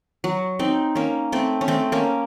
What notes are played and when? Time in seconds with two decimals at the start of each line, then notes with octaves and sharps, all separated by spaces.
0.24 F#3
0.59 C4 D#4
0.95 A#3 C#4
1.32 A3 C4
1.61 C#4
1.68 A3 C4
1.92 A#3 C#4